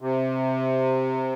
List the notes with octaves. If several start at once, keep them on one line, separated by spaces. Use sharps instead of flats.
C3